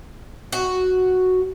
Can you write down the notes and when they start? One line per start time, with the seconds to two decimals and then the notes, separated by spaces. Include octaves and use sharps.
0.52 F#4